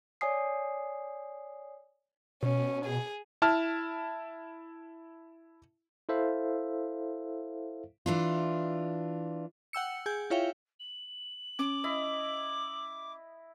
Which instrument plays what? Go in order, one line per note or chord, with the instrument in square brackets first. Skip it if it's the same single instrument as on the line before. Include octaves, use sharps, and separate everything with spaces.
[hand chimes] C#5 D5 G#5 D#6 C7
[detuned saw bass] B2 [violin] C#4
[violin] G#4
[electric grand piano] E4 A5 F6
[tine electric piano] E4 A4 C5 E5 F5
[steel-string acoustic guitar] E3 D4 F4
[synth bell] F#5 G5 E6 C#7
G#4 G#5 G6
E4 F4 C#5 E5 F5 G5
[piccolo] F#7
[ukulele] C#4 [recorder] D6
[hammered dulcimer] E4 D#5